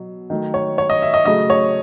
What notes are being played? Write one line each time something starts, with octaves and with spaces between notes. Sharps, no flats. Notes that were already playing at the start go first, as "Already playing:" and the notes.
Already playing: B2 F#3
D#3 F#3 A3
C#5
C#5
D#5
E5
D#5
C#3 F#3 A3 D#5
C#5